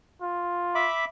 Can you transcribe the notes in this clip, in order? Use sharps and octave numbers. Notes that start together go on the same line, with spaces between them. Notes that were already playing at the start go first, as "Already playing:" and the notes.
F4
E5 B5 D6